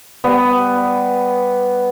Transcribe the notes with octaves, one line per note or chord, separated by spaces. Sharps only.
G3 B3